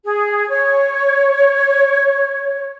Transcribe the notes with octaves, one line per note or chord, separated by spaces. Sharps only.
G#4
C#5